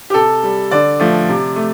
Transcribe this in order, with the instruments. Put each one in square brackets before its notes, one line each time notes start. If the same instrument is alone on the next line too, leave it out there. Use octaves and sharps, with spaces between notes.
[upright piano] G4
C3 A4
G3
D3 D5
F3 A3
C3
A3